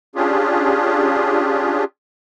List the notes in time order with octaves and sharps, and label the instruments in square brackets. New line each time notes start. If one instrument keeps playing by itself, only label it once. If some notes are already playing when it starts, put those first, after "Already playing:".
[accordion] C#4 D4 F4 G4 G#4